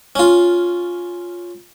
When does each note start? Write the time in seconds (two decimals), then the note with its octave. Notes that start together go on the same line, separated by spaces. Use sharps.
0.16 C#4 F4